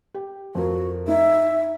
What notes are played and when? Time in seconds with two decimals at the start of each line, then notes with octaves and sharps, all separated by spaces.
0.14 G4
0.55 F2 F#4 A#4
1.08 D#4 E5